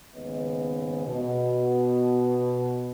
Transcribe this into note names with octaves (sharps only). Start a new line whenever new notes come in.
D#2 G#2 C#3 B3 D#5
B2